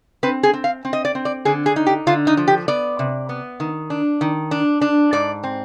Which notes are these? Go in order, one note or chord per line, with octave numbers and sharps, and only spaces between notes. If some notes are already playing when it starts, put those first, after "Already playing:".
C4 B4
G#4
C4
F5
C4
D#5
D5
C4
D5
D3 G#4
G#4
D#4
G4
D3 F4
D#4
F3
G4
B3 D5
C3
B3
D#3
D4
D#3
D4
D4
G#2 D5
C4